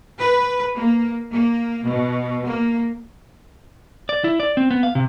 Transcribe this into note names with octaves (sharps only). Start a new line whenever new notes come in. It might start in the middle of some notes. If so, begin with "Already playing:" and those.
B4
A#3
A#3
B2
A#3
D5
E4
D5
C4
B3
F5
C3